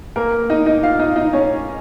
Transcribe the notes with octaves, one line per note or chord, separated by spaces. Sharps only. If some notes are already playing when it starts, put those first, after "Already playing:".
A#3 A#4
D#4 D#5
D#4 D#5
F4 F5
D#4 D#5
D#4 D#5
C#4 C#5